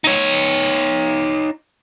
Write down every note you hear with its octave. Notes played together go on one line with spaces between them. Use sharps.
D#4 C#5